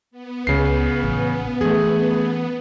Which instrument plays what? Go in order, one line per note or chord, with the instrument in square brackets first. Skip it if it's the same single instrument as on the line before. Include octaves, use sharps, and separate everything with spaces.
[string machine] B3
[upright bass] C#2 [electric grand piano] C#3 C7
[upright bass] A1 F4
[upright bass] E3 C#4 [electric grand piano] A3 G#4